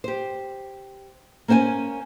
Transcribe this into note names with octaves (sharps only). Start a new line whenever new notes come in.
G4 C5
A#3 C#4 C5 G5 G#5